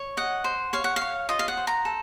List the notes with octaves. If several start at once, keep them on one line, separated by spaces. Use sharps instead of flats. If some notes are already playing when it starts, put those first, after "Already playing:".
Already playing: C#5
D#5 F#5
C5
C#5 F5
F#5
F5
C#5
F4 D#5
F5
F#5
C5
A#5
A4